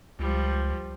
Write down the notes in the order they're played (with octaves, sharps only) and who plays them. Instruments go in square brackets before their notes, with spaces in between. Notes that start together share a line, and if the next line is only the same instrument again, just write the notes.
[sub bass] C#2 [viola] F3 G3